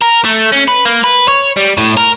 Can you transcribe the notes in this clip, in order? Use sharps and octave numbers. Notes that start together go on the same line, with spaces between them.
A#4
A3
C#4
B4
A#3
B4
C#5
G3
A2
A#4